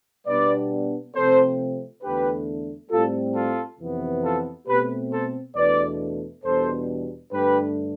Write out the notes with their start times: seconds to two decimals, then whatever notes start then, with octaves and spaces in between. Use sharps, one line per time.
0.27 B2 G3 B3 D4 B4 D5
1.15 C3 F3 A3 C4 A4 C5
2.03 E2 D3 A3 D4 G4 B4
2.91 A2 G3 C4 F4 A4
3.35 F4 A4
3.80 F2 C3 E3 B3
4.24 F4 A4
4.67 B2 A3 C4 G4 B4
5.11 A4 C5
5.55 E2 B2 A3 D4 B4 D5
6.43 E2 B2 G3 D4 A4 C5
7.32 G2 D3 A3 D4 G4 B4